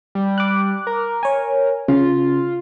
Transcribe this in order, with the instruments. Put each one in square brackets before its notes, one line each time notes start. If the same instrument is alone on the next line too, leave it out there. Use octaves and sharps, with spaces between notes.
[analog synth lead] G3
[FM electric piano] D6 F#6
[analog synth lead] A#4
[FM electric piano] C#5 G#5
[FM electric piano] C#3 [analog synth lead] F4